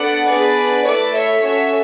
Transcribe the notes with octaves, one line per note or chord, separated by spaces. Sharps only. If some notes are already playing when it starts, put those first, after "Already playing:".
Already playing: B3 D4 A4 D5 F#5
B3 D4 G#4 B4 D5
A3 E4 A4 B4 D5
C#5 E5
C#4 F#4 A4 C#5 E5